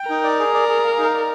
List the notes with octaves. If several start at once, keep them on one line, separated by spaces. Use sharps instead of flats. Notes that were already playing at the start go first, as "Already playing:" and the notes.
Already playing: G5
D#4 A#4
D5
G#4
D5
G#4
F5
D#4
D5